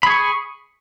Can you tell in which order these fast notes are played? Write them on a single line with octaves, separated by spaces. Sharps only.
B5 G#4 C#6